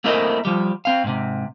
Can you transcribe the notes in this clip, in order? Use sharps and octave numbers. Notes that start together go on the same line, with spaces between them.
A3 A#3 C4 E4 A#4 D#5
F3 G3
C4 F5
G#2 C3